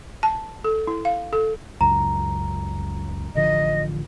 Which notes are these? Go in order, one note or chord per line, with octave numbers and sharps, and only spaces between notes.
A5
A4
E4
F5
A4
C#2 F#2 A#5
A1 D3 F3 D#5